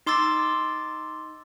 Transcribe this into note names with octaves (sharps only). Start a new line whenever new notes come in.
D#4 C6 D6 E6 A6